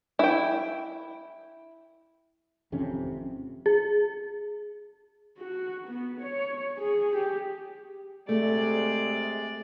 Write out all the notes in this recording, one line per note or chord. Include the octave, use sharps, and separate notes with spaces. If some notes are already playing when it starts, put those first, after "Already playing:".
E4 G5
G#1 F2 C3 C#4
G#4
F#4
B3
C#5
G#4
G4
C3 G#3 A3 D5